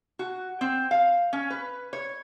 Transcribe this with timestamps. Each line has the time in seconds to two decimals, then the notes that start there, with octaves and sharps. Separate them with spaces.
0.19 F#4
0.61 C4
0.91 F5
1.33 C#4
1.50 B4
1.93 C#5